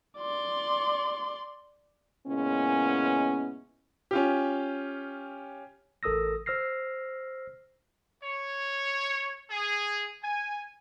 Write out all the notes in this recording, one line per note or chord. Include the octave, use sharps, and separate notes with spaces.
D5 C6
A#2 C#3 G#3 B3 C#4 E4
C#4 F4 G4
A1 A4 A#4 D#6 E6 A#6
C5 E6 F6 A#6 C7
C#5
G#4
G#5